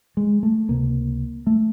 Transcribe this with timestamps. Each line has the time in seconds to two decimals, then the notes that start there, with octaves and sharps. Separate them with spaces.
0.17 G#3
0.43 A3
0.68 C#2 C3 A#3
1.47 A3